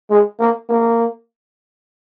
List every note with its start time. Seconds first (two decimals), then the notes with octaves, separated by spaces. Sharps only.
0.11 G#3
0.40 A#3
0.69 A#3